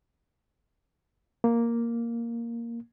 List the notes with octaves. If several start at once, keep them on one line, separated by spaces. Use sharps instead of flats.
A#3